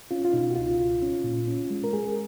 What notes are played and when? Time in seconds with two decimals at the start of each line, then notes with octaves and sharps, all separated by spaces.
0.11 C#4 F4
0.25 F4
0.33 B2 D#4
0.51 F#4
0.56 C#2 F4
0.78 C#2
1.02 C#4
1.24 A#2
1.48 C#4
1.70 G#3
1.84 A#4
1.93 G#3 G#4